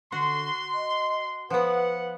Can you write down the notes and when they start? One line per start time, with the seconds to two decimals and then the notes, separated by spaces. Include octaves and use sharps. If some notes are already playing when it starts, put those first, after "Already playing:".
0.12 D3 F#4 C6
0.74 D#5
1.50 F3 B3 B4 F#5